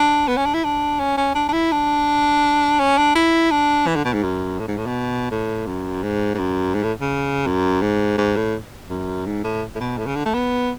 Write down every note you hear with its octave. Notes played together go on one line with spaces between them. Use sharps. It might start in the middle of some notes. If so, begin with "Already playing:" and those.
Already playing: D4
B3
C#4
D4
E4
D4
C#4
C#4
D4
D4
E4
D4
C#4
D4
E4
D4
E3
D3
B2
G#2
F#2
A2
G#2
A2
B2
A2
F#2
G#2
G#2
F#2
G#2
A2
C#3
F#2
G#2
G#2
A2
F#2
G#2
A2
A2
B2
A2
C#3
D3
A3
B3